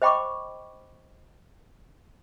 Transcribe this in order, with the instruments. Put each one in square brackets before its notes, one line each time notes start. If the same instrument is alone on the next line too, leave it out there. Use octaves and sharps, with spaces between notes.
[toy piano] C5 D#5 G5 B5 C#6 D6